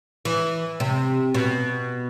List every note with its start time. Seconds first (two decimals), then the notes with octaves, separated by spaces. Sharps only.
0.25 E3
0.80 C3
1.35 B2